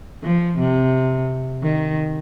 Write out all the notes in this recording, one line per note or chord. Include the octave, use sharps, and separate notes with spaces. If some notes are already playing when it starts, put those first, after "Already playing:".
F3
C3
D#3